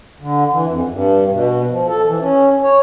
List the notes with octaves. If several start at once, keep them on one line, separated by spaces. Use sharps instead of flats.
D3
E3
F2
G2
B2
F3
A4
E3
C#4
C#5